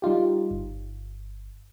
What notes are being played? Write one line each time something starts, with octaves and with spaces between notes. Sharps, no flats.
G3 D#4 F4 G4
G1